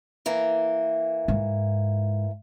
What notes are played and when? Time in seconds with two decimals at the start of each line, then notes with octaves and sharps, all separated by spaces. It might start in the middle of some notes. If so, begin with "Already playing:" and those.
0.26 E3 A#3
1.28 G#2